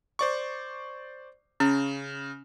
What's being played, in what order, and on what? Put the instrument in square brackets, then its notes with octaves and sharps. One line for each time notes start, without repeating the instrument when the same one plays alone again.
[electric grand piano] C5 D5 C#6
[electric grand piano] C#3 [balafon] C#4